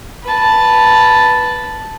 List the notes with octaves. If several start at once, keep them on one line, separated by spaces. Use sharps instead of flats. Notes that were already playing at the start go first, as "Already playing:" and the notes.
B4 A5